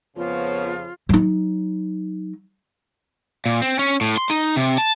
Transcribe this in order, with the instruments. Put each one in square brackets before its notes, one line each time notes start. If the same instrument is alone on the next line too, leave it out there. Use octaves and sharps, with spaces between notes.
[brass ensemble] F2 C#3 F3 [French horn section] B3 C#5 [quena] F4
[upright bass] F#3 D#4
[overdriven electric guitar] A#2
C4
C#4
A2
C6
D#4
C3
A5